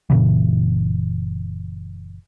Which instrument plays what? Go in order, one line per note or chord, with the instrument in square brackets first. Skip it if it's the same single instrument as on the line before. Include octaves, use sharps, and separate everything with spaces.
[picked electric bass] F#1 A#2 C#3 E3